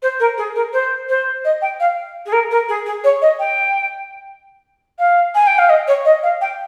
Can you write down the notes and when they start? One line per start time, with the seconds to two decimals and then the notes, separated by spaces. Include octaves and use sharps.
0.02 C5
0.20 A#4
0.38 G#4
0.55 A#4
0.73 C5
1.09 C5
1.45 D#5
1.62 G5
1.80 F5
2.26 G#4
2.32 A#4
2.51 A#4
2.69 G#4
2.86 G#4
3.04 C#5
3.22 D#5
3.39 G5
4.99 F5
5.35 G#5
5.47 G5
5.58 F5
5.69 D#5
5.88 C#5
6.05 D#5
6.23 F5
6.41 G5